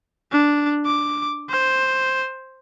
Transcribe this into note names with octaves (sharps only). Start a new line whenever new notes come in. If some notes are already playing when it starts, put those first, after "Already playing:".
D4
D6
C5